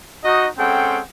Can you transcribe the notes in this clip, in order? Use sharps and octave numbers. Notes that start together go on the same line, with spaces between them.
D#4 F#4 D#5
G#3 C4 C#4 A4 F#5 G5